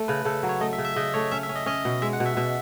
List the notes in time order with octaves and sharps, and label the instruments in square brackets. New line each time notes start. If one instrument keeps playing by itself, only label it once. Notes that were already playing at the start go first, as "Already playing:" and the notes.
Already playing: [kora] A3
[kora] C#3 [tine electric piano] B4
[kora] C#3 [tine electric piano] A4
[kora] F#3
[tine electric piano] C#5
[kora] A3 [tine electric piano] D#5
[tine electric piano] E5
[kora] C#3
[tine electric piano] E5
[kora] C#3 [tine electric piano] D#5
[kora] A3 [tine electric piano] C#5
[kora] C#4 [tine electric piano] E5
[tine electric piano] E5
[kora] C#4
[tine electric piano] D#5
[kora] C#4 [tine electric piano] D#5
[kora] B2
[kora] G#3 [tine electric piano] E5
[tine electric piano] F#5
[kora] B2
[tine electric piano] E5
[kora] B2 [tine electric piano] E5